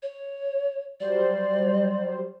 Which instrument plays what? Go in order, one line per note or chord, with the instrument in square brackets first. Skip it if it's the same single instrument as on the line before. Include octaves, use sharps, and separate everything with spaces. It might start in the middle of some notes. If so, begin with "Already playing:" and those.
[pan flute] C#5
[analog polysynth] F#3 G3 C5 [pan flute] D5